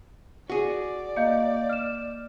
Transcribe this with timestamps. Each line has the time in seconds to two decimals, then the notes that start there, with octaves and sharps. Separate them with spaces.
0.50 F#4 G#4 D5
1.16 A#3 D#5 F5 G6
1.69 F6 E7